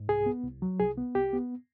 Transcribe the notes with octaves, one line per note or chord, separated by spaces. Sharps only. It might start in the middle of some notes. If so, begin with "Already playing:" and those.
Already playing: G#2
C2 G#4
B3
C2
F#3
C2 G#4
B3
C2 G4
B3